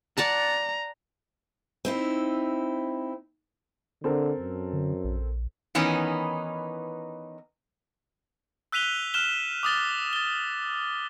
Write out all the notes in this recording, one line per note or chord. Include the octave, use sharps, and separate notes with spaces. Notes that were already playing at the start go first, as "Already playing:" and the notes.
D5 F#5 A5 A#5
C4 D#4 E4
D3 C4 A4 A#4
F#2
D3
A#1
D#3 E3 B3 C#4 D#4
E6 F#6 B6 D#7 F7 G7
F6 F#6 E7 G7
D6 D#6 A6 G7
A6 G7